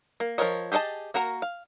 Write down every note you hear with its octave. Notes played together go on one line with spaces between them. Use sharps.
A#3
F3 A#3 A#4 C#5 D#5
G4 G#4 A#4 D#5 A5
A#3 F#4 A#4 A#5
F5